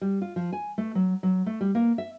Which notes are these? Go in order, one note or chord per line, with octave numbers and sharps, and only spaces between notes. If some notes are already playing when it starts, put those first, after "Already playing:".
G3
F4
F3
G#5
A3
F#3
F#3
A3
G3
A#3
E5